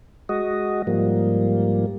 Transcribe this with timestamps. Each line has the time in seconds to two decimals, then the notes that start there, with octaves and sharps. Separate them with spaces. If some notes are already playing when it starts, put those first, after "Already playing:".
0.29 G#3 F#4 D#5
0.87 G#2 F3 G3 A#3